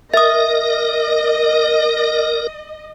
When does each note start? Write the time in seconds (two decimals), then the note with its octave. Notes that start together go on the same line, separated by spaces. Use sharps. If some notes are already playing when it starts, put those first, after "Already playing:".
0.14 A#4 D#5 E5 D#6